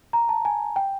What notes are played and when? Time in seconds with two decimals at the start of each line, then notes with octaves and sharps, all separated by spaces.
0.13 A#5
0.29 A5
0.45 G#5
0.76 G5